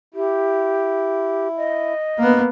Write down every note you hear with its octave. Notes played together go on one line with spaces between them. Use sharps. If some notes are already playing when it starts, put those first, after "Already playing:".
E4 G4
D#5
G2 A#3 B3